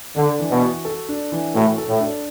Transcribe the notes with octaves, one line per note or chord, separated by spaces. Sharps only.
D3 D4
E3
B2
F#4
A4
D4
E3
A2 F#4
A4
A2
D4